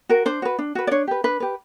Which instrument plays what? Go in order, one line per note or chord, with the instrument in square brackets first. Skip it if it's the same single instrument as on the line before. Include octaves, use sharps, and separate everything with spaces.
[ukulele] F#4 A#4
D4 C5
F#4 B4
D4
F#4 B4
D5
D4 C#5
G4 B4
D4 B4
G4 B4